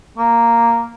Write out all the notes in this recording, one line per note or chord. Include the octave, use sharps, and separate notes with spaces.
A#3